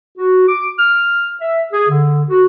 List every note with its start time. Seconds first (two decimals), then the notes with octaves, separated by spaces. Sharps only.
0.18 F#4
0.48 D6
0.79 F6
1.41 E5
1.72 G#4
1.89 D3
2.29 F#4